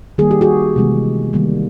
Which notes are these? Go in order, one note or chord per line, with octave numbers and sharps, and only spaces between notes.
D#3 G3 A#3 G#4
G4
F#4 G#4
C3 E3 G#3 B3
D#3 G3 A#3